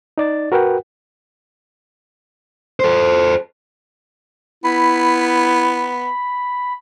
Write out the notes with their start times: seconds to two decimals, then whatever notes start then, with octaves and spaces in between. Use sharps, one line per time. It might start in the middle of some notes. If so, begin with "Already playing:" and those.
0.18 D#4 D5 A6
0.52 F#4 A#4 B4 F#5 G5
2.80 A4 C5
4.64 B3 E4 B5